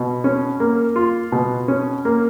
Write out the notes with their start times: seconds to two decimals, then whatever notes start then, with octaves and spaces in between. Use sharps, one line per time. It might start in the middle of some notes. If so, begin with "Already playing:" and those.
Already playing: B2
0.24 C#4
0.60 A#3
0.96 F4
1.32 B2
1.68 C#4
2.05 A#3